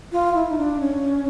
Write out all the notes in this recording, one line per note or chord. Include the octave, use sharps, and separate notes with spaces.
F4
E4
D#4
D4
C#4